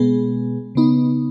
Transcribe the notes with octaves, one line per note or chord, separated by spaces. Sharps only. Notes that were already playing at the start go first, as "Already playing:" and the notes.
Already playing: B2 G#3 B3 G#4
C#3 B3 D#4